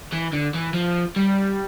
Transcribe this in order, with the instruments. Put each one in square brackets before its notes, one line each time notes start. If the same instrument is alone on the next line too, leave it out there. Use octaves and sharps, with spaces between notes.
[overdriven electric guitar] E3
D3
E3
F3
G3